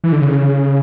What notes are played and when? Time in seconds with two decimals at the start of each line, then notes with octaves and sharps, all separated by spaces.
0.04 E3
0.12 D3
0.22 C#3